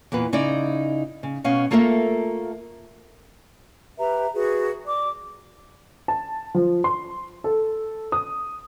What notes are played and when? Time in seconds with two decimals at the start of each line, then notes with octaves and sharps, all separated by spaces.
0.12 E2 A#2 A#3 B4
0.33 C#3 D#4 E4 D5
1.23 C#3
1.44 B2 C#4 F5
1.71 A3 A#3 F4 A4 A#4 E5
3.98 G4 B4 E5 A#5
4.34 F#4 G#4 B4
4.85 D5 D6
6.08 A5
6.55 F3
6.84 C6
7.44 A4
8.12 D#6